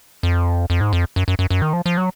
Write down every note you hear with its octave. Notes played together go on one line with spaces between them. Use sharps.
F2
F2
G#2
F2
F#2
F#2
F#2
F#2
D#3
F3
F3
F#3